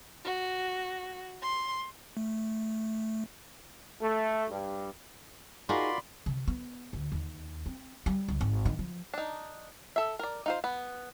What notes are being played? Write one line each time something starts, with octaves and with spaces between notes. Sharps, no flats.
F#4
C6
A3
A3
G2
D#4 F4 F#4 G#4 A#4 D5 B5 C6
C3
B3
D2
D#2
C4
G3
C#2
G#1
D#3
F3
D4 D#4
A4 E5
A#4 D5
D#4 F4 C5
B3